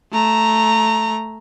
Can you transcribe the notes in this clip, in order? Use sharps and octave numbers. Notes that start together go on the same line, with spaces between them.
A3 A#5